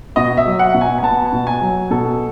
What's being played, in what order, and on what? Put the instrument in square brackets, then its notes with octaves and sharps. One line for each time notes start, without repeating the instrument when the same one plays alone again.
[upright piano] B2 D#5
E5
F#3
F#5
B2
G#5
G#5
B3 A5
B2
G#5
F#3
B2 A4